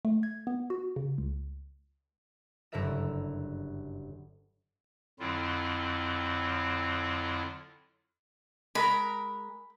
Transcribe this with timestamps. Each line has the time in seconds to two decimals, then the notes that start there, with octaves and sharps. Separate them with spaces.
0.05 A3
0.23 G#6
0.47 B3
0.70 F#4
0.96 C#3
1.18 C#2
2.72 F#1 G2 D3 A#4 E5 E7
5.19 F2 D3 F#3 C4 E4 F4
8.75 G#3 A#4 A#5 B5